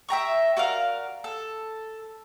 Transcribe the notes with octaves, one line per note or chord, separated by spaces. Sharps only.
E5 G5 A#5 C#6
F#4 A#4 D5 F5
A4